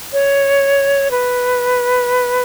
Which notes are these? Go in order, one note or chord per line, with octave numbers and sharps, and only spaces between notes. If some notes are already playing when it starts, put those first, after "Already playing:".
C#5
B4